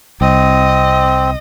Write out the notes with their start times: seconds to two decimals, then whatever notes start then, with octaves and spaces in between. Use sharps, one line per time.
0.21 C2 C4 D#5